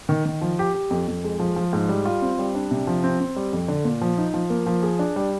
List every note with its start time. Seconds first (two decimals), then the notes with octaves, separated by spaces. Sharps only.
0.09 D#3
0.26 D#3
0.42 F3
0.59 G4
0.74 G4
0.91 F2
1.08 F2
1.24 G#3
1.40 F3
1.56 F3
1.73 G#2
1.89 G3
2.05 F4
2.22 C4
2.39 G3
2.55 D4
2.71 C3
2.87 F3
3.04 C4
3.21 C4
3.36 G3
3.53 F2
3.68 D3
3.85 A#2
4.02 F3
4.18 D#4
4.34 F3
4.50 A#3
4.66 F3
4.83 G#4
4.99 D4
5.16 G3